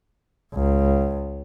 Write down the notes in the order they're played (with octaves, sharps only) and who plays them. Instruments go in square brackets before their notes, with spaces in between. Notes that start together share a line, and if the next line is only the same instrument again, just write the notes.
[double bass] C#2